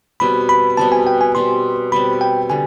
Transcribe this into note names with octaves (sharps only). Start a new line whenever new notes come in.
B2 G3 C4 B5
B5
B2 G3 C4 A5
G#5
G5
G#5
B2 G3 C4 C6
B2 G3 C4 B5
G5
D3 G3 G#5